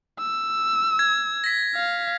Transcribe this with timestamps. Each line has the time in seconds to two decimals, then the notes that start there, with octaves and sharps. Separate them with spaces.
0.20 E6
0.99 G#6
1.44 A#6 B6
1.76 F5